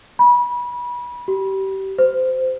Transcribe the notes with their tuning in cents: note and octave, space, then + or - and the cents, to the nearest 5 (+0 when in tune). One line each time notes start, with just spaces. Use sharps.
B5 -25
G4 -30
C5 -20